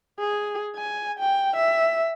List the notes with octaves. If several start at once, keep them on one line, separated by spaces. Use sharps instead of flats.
G#4
G#5
G5
E5